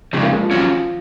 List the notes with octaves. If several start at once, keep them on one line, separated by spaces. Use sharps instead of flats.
F2 C#3 F3 G#3
A#3
G#3
F3
D#3 F#3 C#4